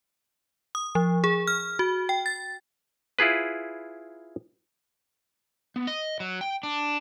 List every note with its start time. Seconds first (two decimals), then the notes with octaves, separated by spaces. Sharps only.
0.75 D#6
0.95 F3
1.24 G#4
1.47 F6
1.79 F#4
2.09 G5
2.26 A6
3.19 E4 F4 G#4 B4
5.76 B3
5.87 D#5
6.20 F#3
6.41 G5
6.63 D4